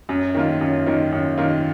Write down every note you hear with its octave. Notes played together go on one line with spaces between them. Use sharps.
F#2
D#3 A#3 F4
F#2
D#3 A#3 F4
F#2
D#3 A#3 F4